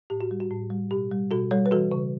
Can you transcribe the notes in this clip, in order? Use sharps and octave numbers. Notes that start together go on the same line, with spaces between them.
A2 G4
F#4
G3
F#4
A2
G3
B2 G4
G3
B2 F#4 A4
G3 A4 C#5
B4
E3 F#4 A4
C#3